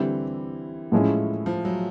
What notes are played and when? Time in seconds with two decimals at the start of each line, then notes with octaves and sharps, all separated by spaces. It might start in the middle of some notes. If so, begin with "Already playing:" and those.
Already playing: D3 E3 G3 C4 E4 G4
0.92 A2 F3 G#3 C#4 E4
1.46 F3
1.65 F#3